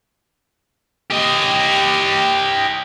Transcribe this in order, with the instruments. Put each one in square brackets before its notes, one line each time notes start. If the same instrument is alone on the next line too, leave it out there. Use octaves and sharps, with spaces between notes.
[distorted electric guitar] G4 D#5